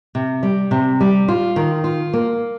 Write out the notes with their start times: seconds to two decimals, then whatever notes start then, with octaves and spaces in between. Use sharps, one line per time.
0.15 C3
0.43 G3
0.71 C3
1.00 G3
1.28 F4
1.56 D#3
1.84 F4
2.13 A#3